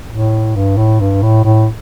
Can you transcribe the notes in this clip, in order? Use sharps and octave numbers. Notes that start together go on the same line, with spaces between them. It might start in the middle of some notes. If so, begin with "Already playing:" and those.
A2
G2
A2
G2
A2
A2